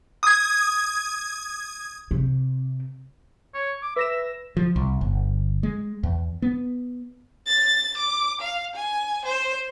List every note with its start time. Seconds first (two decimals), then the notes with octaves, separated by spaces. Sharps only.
0.23 D#6 G#6
2.11 C3
3.54 C#5
3.82 D6
3.96 B4 E5 A#6 E7
4.57 F3
4.76 C2
5.01 G1
5.63 G#3
6.03 E2
6.42 B3
7.46 A6
7.98 D6
8.41 F5
8.76 G#5
9.25 C5